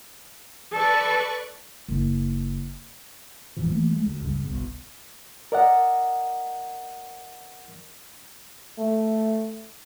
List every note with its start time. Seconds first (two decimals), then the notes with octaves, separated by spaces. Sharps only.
0.72 A4 B4 D5 C#6
1.88 F#1
3.57 D#1 G#2 E3 F3
3.70 E3 A3 A#3
3.91 G#3 A3
4.06 D2
4.24 C#2 G2 C#3
4.44 G1 C2 B2
5.52 A#4 D5 D#5 F#5
8.78 A3